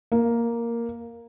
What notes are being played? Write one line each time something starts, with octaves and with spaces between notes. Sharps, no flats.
A#3